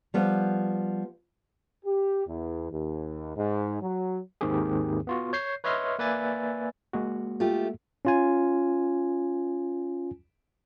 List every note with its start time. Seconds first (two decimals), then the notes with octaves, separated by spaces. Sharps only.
0.14 F3 G3 B3
1.86 G4
2.27 E2
2.71 D#2
3.36 G#2
3.82 F#3
4.41 D#2 G#2 D#3 C4 G4 G#4
5.07 B3 F4 F#4
5.33 C#5 G6 C7
5.64 B4 C#5 D#5 E5 C6 F6
5.99 A#3 B4 D5 E5 G#5 A6
6.93 G#3 A#3 F#4
7.40 A3 F4 G4
8.05 C#4 F4 G#5